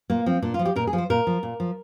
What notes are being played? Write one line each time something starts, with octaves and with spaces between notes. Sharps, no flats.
A#2 A#3
F3 C4
A#2 D4
F4
F3
G4
A#2 A#4
G#4
F3
C5
A#2 A#4
F3
A#2
F3